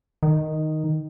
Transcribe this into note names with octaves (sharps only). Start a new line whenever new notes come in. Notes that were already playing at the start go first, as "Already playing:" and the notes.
D#3